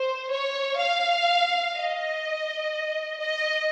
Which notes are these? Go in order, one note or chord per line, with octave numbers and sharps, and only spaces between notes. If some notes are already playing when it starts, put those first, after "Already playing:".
Already playing: C5
C#5
F5
D#5
D#5